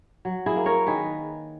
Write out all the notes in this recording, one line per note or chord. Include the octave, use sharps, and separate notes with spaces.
F#3
E4 G#4
A#3
A#4 C#5
D#3 G#4 B4